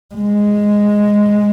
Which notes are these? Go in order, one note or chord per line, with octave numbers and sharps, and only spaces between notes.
G#3